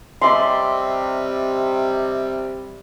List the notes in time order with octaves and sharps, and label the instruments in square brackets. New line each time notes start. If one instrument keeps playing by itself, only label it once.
[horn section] C3 G3 [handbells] D#5 E5 D6 [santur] C6